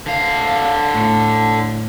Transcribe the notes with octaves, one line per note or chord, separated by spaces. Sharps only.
D3 F5
A2